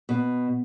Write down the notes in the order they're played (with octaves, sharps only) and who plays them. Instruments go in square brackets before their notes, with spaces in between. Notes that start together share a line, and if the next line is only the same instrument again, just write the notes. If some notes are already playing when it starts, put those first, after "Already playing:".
[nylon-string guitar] B2